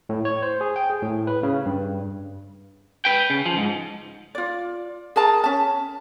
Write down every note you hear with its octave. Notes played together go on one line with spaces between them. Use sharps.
A2
C#5
C5
G#4
G5
G#4
A2
B4
C#3
G2
B4 G5
C#3
F3
G#2
F4 D5
G#4 A#4 A5 A#5
C#4 A5